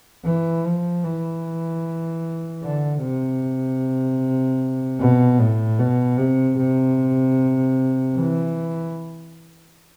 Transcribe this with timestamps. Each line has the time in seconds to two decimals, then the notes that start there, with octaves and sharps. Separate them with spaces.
0.24 E3
0.65 F3
1.03 E3
2.63 D3
3.01 C3
4.99 B2
5.39 A2
5.78 B2
6.17 C3
6.57 C3
8.16 E3